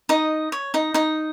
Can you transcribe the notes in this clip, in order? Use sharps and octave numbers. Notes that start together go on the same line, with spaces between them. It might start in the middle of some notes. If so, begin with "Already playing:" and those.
D#4 D#5
C#5
D#4 D#5
D#4 D#5